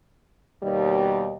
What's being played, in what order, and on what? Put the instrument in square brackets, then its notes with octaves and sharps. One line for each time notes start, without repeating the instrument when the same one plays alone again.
[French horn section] D#2 B2 G3